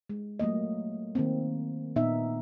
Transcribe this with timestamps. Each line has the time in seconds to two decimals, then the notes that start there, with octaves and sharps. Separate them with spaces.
0.10 G#3
0.39 F#3 A3 A#3 D#5
1.15 D#3 A#3 C4
1.96 A#2 A#3 B3 D#4 E5